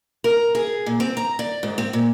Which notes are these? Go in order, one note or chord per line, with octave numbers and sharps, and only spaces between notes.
A#4
G#4
A#2
C4
A#5
D5
G#2
C4
A#2